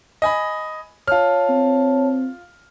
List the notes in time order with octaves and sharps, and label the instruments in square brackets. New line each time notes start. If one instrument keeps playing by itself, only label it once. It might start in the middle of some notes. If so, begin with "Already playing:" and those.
[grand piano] D#5 G#5 B5
[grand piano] F4 F6 [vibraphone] C#5 A5
[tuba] C4